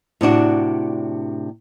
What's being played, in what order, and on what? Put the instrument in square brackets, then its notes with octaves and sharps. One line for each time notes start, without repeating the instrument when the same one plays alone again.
[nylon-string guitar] A2 C3 D4 F#4